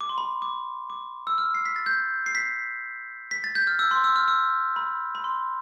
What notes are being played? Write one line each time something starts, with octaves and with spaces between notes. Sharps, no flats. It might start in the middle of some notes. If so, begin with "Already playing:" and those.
D6
C6
B5
D6
D6
E6
F6
C7
B6
A6
G6
C7
B6
B6
A6
G6
F6
E6
C6
E6
F6
E6
B5
B5
C6